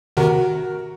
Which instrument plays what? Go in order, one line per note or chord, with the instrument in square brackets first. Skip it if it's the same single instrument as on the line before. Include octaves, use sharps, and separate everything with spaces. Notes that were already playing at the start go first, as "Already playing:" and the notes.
[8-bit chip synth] C3 D#3 [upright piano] F#4 A#4